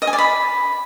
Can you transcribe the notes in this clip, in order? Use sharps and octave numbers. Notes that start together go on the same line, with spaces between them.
D#5
G#5
D5
B5